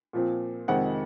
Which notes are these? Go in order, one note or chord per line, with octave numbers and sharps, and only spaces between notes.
A#2 F3 C4
F2 C3 D#3 G#3 C4 F#5